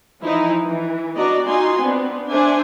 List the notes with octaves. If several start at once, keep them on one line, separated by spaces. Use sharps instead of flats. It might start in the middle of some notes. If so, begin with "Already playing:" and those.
E3 F3 D#4 E4
E3
B3 D4 F#4 D5 D#5 A#5
D#4 F4 F#4 G#5 C6
B3 C4 D4
D4 C5 E5 G#5